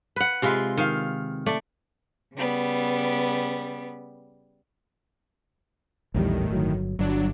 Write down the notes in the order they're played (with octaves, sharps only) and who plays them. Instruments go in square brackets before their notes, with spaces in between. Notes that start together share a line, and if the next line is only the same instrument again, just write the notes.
[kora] B4 F#5
C3 G#3 F4 B4
D#3 F5
A3 D5
[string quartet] C#3 G3 B3
[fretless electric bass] A#1 E2 G3 [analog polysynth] A2 D#3
[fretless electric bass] G1 F#3
[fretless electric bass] G1 [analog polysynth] F#3 D4